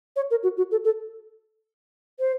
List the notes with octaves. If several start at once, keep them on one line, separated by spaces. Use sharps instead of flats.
C#5
A#4
F#4
F#4
A4
A4
C5